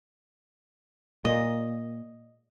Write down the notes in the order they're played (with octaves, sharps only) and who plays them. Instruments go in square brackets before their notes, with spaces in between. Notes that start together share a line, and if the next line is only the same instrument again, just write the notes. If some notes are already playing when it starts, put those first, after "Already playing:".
[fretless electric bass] A#2 [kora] D#5